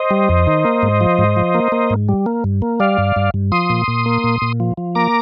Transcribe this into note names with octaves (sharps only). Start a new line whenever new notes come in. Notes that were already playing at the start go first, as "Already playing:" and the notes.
Already playing: C5 D#5
G3
F2
D#3
A#3
G#2
F3
G#2
F3
A#3
A#3
G#2
G3
A#3
G2
A#3
G3 D5 F5
G2
G2
G2
F3 C6 D#6
A#2
A#2
A#3
A#2
A#2
F3
F3
A#3 A#5 D6